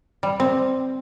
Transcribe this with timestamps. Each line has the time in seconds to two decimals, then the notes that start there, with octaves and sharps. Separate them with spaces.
0.23 G3
0.40 C4